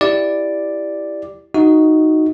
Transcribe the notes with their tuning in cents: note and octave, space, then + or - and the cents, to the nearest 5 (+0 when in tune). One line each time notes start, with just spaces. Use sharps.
E4 +0 G4 +0 D5 +0
D#4 +0 F#4 +0 D#5 +15